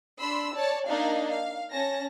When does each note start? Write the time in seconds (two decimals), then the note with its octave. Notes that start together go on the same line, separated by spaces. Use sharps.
0.20 D4 B5 C6 E6
0.55 C#5 D5 A5
0.89 A#3 D4 D#4 D#5 F5
1.30 F5
1.72 C#4 A5 A#6